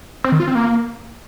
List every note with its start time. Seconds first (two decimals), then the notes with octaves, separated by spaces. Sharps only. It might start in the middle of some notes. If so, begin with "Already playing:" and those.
0.24 C4
0.32 D#3
0.40 F4
0.47 C4
0.55 A#3